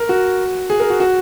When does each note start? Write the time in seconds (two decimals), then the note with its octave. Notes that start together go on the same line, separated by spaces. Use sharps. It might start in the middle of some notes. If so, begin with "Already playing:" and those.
Already playing: A#4
0.09 F#4
0.70 G#4
0.80 A#4
0.90 F#4
1.00 F#4